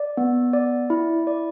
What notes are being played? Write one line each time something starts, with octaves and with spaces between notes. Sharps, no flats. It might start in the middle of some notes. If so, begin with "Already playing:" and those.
Already playing: D5
B3
D5
E4
D5